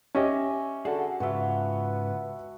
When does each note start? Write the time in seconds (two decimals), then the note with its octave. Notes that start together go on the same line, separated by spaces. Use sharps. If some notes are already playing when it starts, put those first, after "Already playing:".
0.15 C#4 G4 D#5 E5 G#5
0.85 D3 F#4 G#4 A4 A5
1.20 G#2 C#3 B3 F4 F#4 E5